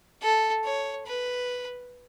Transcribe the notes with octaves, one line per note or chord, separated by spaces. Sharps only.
A4
C#5
B4